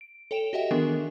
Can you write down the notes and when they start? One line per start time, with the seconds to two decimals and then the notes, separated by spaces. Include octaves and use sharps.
0.01 D7
0.31 A4 C#5 G5 D7 E7 F7
0.53 F#4 G4 D#5 E5 F#5 G5
0.71 D#3 E3 B3 D4 G#4 A#4